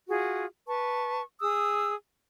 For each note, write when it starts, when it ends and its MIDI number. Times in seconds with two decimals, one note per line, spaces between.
0.09 0.45 65
0.09 0.45 66
0.09 0.45 68
0.67 1.22 71
0.67 1.22 81
0.67 1.22 85
1.40 1.95 68
1.40 1.95 87
1.40 1.95 88